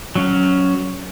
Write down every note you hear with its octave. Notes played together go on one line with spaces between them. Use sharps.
F#3 C#4 F5